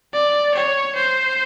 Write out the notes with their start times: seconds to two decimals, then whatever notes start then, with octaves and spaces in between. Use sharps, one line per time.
0.13 D5
0.54 C#5
0.95 C5